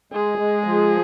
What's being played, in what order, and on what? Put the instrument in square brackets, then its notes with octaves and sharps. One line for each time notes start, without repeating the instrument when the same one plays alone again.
[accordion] G#3 [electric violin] G#4
[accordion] G#3
F3